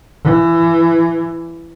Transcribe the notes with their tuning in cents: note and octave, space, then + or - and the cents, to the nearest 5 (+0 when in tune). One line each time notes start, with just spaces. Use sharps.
E3 +20